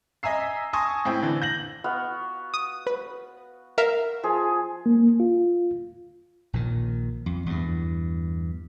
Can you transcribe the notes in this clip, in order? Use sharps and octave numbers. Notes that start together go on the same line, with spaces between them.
D#5 E5 G#5 A#5 E6 C7
G#5 A5 C6 C#6 D#6 A#6
A2 C4 E4 G5
D3 E3
G6 A#6 F#7
B3 F#4 F5
D#6
B4
A#4 E5 F5
F3 G#4
A#3
F4
A#1 A#2 D#3
F2
E2 G2